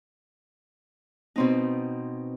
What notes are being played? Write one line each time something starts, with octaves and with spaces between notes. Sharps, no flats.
B2 C4 D#4